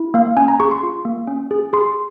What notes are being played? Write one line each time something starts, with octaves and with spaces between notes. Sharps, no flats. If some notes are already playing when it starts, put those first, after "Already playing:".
Already playing: E4
A#3 F5
C#4 G#5
A#5
G#4 C#6
C6
F4
A#3
C#4
G#4
G#4 C6